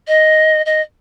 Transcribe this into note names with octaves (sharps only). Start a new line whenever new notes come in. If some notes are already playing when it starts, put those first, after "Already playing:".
D#5
D#5